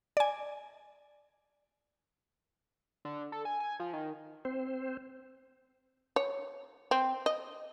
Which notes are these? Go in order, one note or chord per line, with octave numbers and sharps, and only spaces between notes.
D5 G#5
D3
A4
G#5
G#5
F3
D#3
C4 C5
C#5
C4
D#5